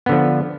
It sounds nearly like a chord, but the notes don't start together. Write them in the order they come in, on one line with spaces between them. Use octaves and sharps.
B3 D3 F3